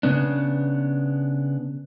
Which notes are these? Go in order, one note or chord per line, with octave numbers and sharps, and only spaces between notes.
C#3 B3 D4